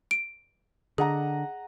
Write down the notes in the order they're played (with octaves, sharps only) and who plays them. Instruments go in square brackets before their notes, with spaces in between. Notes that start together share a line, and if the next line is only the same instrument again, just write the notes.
[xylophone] D7
[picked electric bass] D3 [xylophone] G#4 [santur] D#5 F#5 A#5